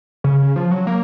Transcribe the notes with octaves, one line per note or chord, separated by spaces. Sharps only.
C#3
F3
F#3
A#3